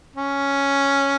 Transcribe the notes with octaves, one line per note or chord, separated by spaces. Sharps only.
C#4